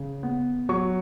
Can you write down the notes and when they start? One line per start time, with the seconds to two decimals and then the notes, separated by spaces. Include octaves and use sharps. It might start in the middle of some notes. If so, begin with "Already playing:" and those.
Already playing: C#3
0.23 B3
0.69 F#3 C#6